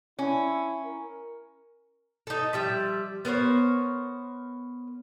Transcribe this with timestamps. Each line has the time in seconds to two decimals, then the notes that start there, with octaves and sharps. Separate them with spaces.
0.19 C#4 E4
0.84 A#4
2.27 D#4 A4
2.53 F3 G3 E5
3.25 B3 A#4 C5 C#5